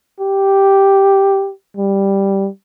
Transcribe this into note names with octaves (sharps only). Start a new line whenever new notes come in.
G4
G3